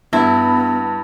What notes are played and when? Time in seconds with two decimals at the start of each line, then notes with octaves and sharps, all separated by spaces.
0.13 G2 B3 E4